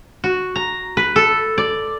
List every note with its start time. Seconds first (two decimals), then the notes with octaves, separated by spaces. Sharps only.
0.24 F#4
0.56 A#5
0.97 B4
1.16 A4
1.58 D5